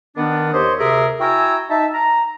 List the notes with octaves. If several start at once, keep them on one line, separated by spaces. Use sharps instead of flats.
D#3 B3 D4
D#2 G4 C5 C#5 D#5 C6
D2 C3 G#4 A#4 E5
E4 F#4 G5 G#5 A#5 E6
D#4 E5 A5
A#5